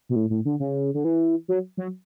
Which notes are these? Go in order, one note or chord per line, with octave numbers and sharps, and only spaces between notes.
B2
A2
A2
D3
C#3
D3
E3
F#3
F#3